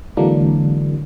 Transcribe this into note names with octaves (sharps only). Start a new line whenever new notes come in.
D3 E3 F#3 G#3 A#3 D4